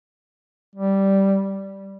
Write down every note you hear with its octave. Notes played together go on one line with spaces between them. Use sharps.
G3